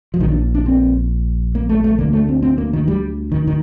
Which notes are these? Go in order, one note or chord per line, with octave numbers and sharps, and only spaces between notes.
F3
A#1 A#2 D#3
D4
D4
C4
A#3
A3
A3
D2 D3 A#3
A3
C4
C4
A#3
D#3
G3
D#3
D#3